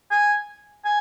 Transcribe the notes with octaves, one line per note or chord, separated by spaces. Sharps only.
G#5
G#5